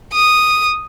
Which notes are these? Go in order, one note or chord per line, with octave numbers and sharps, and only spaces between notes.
D#6